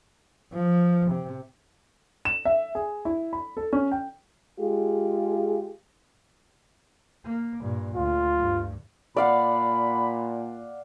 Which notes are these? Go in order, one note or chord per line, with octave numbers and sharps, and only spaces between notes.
F3
C3
E7
E5
G#4
E4
B5
A4
C#4
G5
G#3 F4 G4 G#4
A#3
G2 A#2
D2 F4
G2
A#2 D5 F5 F#5 B5